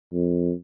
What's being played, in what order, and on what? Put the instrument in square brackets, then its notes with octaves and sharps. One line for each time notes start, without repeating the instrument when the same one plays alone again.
[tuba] F2